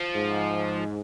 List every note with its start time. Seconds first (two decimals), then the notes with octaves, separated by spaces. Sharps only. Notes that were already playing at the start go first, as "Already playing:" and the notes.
Already playing: F3
0.15 G#2